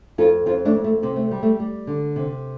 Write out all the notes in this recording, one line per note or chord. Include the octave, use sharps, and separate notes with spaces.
F2 F4 A4
F2 C4 F4
A3 D4
F2
A3
C3 C4
A3
G3
A3
G3
D3
C3